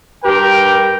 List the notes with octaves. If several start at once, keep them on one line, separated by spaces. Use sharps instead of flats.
G2 G4 A#4 G5